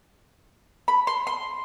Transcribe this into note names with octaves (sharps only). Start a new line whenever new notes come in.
B5
C6
C6